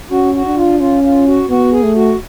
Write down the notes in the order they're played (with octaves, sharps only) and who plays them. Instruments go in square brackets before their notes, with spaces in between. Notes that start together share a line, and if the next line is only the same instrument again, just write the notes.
[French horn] C#4 [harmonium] F#4
[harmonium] F#4
[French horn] D4
[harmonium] F4
[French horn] C#4 [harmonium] F4
[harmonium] F4
F#4
[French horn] B3 [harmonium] F#4
[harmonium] G#4
[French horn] A3
[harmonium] F#4